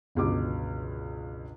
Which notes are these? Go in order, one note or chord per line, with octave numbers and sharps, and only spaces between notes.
G1 C#2 B2 D6